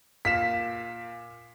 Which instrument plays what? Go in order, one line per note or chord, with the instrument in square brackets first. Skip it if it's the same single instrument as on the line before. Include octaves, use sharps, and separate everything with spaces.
[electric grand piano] A#2 F5 E7 [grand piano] B6